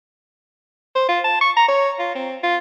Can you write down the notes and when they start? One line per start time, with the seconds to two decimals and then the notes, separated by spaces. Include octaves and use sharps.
0.95 C5
1.09 F4
1.24 A5
1.41 C#6
1.57 A#5
1.68 C#5
1.99 F4
2.15 C4
2.43 F4